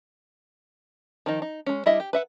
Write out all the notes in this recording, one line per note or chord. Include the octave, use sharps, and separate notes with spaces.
D#3 F3 D#4
D#4
G#3 C#4
G3 D4 E4 D#5 E5
G4
B4 E5 F#5